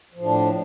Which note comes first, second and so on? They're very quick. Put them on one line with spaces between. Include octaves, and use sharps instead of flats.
F3 A2 D4